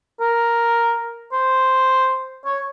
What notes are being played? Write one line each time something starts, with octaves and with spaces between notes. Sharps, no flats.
A#4
C5
C#5